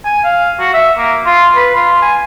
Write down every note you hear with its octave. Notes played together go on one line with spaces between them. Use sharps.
G#5
F5
F#4
E5
A#3
F4
B4
F4
G#5